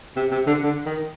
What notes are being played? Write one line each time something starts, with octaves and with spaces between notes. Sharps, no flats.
C3
C3
D3
D3
D#3